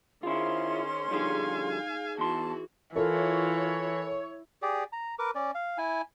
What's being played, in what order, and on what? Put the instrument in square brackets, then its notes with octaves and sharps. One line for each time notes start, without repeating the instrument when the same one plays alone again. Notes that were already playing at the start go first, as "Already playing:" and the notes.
[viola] D#3 [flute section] C#4 C6 [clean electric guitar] E4 F4 [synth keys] G#4 C5
[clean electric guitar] D3 F3 G3 [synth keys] D#4 G#4 [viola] F5 G#5
[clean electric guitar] E2 C6 [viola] E3 F#4 [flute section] A5
[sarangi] E3 [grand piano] E4 A4 A#4 [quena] F4 [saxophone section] C#5
[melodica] G4 G#4 D5
A#5
A#4 B4 D6
C#4 D5
F5
E4 G#5